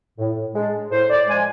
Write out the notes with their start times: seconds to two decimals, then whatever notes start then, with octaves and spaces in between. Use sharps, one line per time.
0.19 A2
0.55 G#3 D4
0.91 A2 C5
1.10 D5
1.28 F3 G#3 G#5